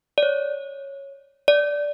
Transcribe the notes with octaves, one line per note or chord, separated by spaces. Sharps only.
D5
C#5
D5